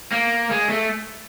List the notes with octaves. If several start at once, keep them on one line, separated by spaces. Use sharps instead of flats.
A#3
G#3
A3